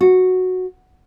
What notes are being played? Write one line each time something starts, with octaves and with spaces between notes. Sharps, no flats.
F#4